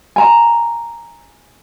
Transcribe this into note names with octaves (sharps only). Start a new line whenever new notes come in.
G#5 A#5